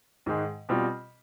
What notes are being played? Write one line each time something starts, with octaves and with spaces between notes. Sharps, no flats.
G#2 D#3 G#3
B2 G3 C4 F4